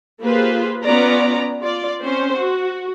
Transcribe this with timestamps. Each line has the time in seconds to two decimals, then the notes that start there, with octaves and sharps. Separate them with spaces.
0.21 A#3 F4 G4 G#4 B4 C5
0.83 B3 C#4 F4 B4 D5 A#5
1.61 F4 D5
2.01 C4 C#4 C5
2.36 F#4